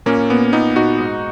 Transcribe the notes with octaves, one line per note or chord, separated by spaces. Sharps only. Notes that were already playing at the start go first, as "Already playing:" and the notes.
A#2 A#3 C#4
A#2 B3
A#2 B3 D#4
A#2 D#4 F#4
G#2